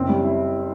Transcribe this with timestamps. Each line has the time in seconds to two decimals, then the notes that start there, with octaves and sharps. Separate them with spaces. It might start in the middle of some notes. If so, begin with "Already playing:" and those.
Already playing: F#1 C4
0.09 G3
0.24 E4